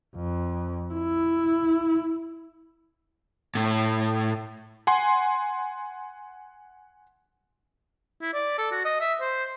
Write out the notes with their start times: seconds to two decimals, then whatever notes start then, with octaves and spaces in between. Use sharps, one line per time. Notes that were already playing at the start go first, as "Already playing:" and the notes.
0.15 F2
0.94 E4
3.55 A2
4.87 F#5 G#5 C6
8.21 E4
8.33 D5
8.58 A4
8.72 F#4
8.85 D#5
9.00 E5
9.21 C5